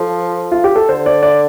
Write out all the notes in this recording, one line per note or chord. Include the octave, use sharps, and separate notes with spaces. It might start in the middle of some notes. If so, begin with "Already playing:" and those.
Already playing: F3 A4
F4
G4
A4
D3 C5
D5
D5